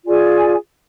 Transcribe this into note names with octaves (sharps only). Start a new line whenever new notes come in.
F4 G#4 D5 G#5